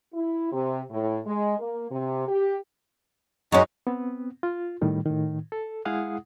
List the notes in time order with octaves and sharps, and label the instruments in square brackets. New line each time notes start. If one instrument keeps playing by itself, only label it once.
[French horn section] E4
C3
A2
G#3
A#3
C3
G4
[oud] F#2 C#4 [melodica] G#3 D#4 F#4
[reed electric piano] B3 C4
F4
A2 D#3 G3
A2 D#3
A4
G#3 E4 G#4 F5 F#5 D#6